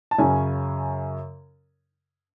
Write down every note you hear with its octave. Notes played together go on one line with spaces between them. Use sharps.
A5
F#2 C#3 F#3 C#4 G#5